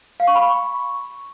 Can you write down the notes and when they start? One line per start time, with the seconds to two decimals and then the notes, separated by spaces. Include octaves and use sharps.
0.20 F5
0.27 C#6
0.35 B5
0.43 C#6